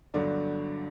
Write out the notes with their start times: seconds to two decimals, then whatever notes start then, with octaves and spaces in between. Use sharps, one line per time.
0.14 G1 G2 D3 F#3 D4